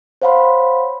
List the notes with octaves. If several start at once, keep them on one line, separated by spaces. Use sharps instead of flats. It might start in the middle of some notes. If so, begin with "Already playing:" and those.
C5 C#5 F5 F#5 B5 C6